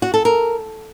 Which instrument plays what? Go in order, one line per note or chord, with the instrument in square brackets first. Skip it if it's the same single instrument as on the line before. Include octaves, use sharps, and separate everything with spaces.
[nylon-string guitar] F#4
A4
A#4